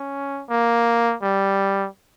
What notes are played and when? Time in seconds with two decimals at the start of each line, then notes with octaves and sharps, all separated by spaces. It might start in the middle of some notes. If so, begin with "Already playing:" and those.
Already playing: C#4
0.50 A#3
1.23 G3